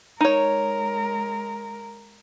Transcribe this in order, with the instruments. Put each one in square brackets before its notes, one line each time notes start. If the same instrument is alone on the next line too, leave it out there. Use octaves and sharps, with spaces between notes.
[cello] G#3 A#4 [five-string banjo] D#4 C#5